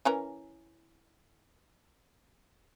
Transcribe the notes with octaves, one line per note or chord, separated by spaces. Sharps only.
E3 C#4 A#4